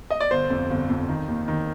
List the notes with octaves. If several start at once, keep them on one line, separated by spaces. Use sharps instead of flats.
D#5
D5
G1 C5
F2
G1
F2
D#3
D#2
D#3